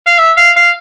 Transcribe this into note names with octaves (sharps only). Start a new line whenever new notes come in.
F5
E5
F5
F5